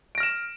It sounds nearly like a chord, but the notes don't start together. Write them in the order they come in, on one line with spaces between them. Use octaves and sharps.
D7 A#6 F6 E7